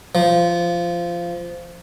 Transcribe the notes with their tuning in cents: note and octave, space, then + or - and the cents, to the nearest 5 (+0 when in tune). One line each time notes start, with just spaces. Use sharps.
F3 -15